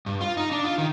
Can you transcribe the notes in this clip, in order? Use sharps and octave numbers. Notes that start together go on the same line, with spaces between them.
G2
F4
D#4
D4
F4
D#3